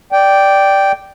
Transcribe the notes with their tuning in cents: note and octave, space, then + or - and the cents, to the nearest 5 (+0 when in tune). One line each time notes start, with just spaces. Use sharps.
D5 +0 G5 -5